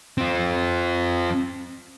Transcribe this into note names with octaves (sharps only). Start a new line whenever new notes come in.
C4 F4